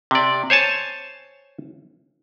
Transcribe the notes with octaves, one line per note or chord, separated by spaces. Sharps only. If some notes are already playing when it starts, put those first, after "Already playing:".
C3 D5
C5 C#5 G#5 A5